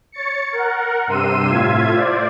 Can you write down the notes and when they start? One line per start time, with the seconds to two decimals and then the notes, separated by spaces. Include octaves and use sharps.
0.12 C#5 A6 C#7
0.52 A#4 F#5
1.07 G2 C3 C6 E6 D#7
1.48 A2 F4 E5 G#6
1.92 C5 D5